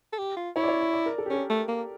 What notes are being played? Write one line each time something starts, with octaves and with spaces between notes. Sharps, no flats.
A4
G4
F4
E4 C#5
D5
C#5
D5
D5
A#4
A4
G4
C#4 A4
A3
A#3